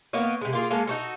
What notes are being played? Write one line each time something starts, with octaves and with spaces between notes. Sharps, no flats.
A#3 B3 C#5 D#5
C3 G#3
A#3 F4 G#4
G#3 A#3 C#4 A4
D#4 F#4 A4